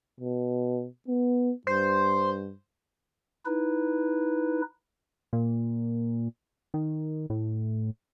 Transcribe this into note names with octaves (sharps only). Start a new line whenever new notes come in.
B2
B3
G2 C5
D#4 E4 B4
A#2
D#3
A2